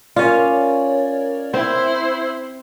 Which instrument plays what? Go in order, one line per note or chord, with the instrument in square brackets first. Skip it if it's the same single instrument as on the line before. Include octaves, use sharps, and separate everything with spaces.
[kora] C#4 F4 [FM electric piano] A#4 C#5 D5
[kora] C4 [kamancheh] E4 C5